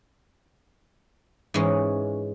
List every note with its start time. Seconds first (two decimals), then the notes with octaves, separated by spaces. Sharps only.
1.54 G#2 E3 G#3 C#4